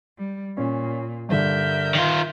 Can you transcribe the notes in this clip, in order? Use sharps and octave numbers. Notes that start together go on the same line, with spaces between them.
G3
A#2 C#4
G2 D3 A#4 E5 G6
D#3 F4